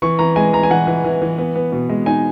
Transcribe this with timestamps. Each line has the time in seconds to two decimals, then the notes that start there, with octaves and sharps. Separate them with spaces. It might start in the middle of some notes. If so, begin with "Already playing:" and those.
0.02 E3 C#6
0.19 E3 A#5
0.36 G#3 G#5
0.53 E3 A#5
0.63 G#5
0.70 E3 F#5
0.87 E3
1.04 E3
1.22 E3
1.38 B3
1.55 B3
1.72 B2
1.89 G#3
2.06 D#4 G#5